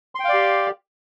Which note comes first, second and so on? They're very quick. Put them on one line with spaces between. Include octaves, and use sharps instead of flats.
C6 G5 F5 D5 G4